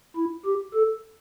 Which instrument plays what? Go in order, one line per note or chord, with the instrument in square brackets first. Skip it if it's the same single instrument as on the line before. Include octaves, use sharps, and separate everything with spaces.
[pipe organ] E4
G4
A4